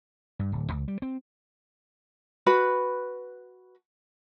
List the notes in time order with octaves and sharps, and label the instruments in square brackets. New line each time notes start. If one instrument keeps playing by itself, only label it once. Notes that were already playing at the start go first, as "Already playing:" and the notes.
[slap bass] G2
D1
C#2
G3
C4
[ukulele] F#4 B4 B5